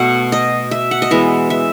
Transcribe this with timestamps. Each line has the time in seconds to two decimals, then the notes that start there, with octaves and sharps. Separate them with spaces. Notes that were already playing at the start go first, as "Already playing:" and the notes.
Already playing: B2 A3 F#5
0.32 D#5
0.71 E5
0.91 F#5
1.02 D#5
1.11 E3 G#3 B3 E5
1.50 E5